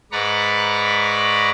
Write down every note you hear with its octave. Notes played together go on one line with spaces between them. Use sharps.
G#2 B4 D5 A#5 B5 C#6